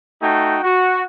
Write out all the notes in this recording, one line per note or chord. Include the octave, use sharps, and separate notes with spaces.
A3 D#4 F#4 G5
F#4